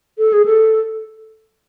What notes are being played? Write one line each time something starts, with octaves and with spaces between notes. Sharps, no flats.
A4
G#4
A4